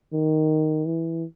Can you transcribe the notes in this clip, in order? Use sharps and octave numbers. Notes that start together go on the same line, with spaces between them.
D#3
E3